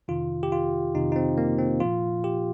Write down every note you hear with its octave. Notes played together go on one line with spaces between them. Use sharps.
F2 C3 D#3 F4
G4
F4
F2 C3 D#3 D#4
D#4
C4
A#3
C4
A#2 F3 F4
G4